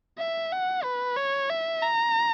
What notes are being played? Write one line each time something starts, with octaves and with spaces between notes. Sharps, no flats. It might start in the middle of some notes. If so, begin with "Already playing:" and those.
E5
F#5
B4
C#5
E5
A#5